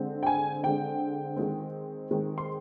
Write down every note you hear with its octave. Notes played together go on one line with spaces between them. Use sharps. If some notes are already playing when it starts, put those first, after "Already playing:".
Already playing: D3 G#3 C4
G5
G#5
D3 G#3 C4 G5
D#3 G#3 C4
D#3 G#3 C4
C6